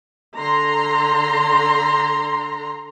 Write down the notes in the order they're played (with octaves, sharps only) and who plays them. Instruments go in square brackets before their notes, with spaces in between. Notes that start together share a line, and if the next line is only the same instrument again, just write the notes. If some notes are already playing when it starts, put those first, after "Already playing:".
[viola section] D3 A#5 C6